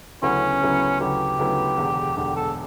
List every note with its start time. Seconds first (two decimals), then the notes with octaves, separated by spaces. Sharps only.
0.22 D2 C#3 F#3 B3 C#4 E4
0.62 D2 C#3 F#3 B3 E4
1.00 D2 C#3 F#3 B3 E4 G4
1.39 D2 C#3 F#3 B3 E4
1.78 E1 E2 D3
2.17 E1 E2 D3 G4
2.36 A4